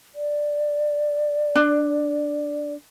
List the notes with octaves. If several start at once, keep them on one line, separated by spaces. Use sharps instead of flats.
D5
D4